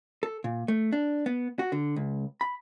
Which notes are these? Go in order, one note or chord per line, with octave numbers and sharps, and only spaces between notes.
A4
A#2
A3
D4
B3
F#4
D3
C#2
B5